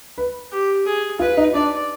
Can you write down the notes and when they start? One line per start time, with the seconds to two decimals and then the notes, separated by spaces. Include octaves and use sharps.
0.18 B4
0.51 G4
0.86 G#4
1.19 F4 B4
1.37 D#4
1.54 D4 D5